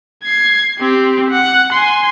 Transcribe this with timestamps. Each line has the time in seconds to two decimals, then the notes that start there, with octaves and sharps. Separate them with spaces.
0.24 G#6 C7
0.79 C4 G4
1.31 F#5
1.72 G#5 C6